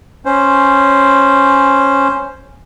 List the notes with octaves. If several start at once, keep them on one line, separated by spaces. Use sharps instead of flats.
C#4 C5